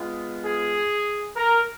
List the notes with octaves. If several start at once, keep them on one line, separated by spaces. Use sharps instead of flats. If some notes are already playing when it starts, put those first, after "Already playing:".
Already playing: G#3 B3 F4
G#4
A#4